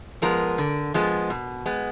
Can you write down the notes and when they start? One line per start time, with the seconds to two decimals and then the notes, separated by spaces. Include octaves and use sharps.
0.22 F3 G#3 B3 A#4
0.58 D3
0.94 F3 G#3 B3
1.30 B2
1.66 G#3 B3